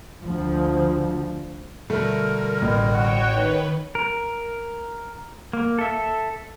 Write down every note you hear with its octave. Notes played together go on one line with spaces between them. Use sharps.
D2 F3
B2 D3 G3 A3 A#4
A1
F#4 C#5 G5
D#3 B4
A#4
A#3
A4 E5